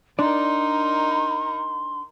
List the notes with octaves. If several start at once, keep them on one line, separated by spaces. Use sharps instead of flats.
D4 D#4 A#4 D5 C6